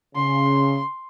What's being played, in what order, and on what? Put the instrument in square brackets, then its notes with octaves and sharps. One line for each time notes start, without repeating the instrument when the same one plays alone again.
[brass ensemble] C#3 [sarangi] C6